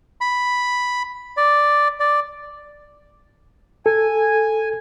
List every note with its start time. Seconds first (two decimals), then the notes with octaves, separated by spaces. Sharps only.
0.21 B5
1.37 D5
2.00 D5
3.86 A4 G#5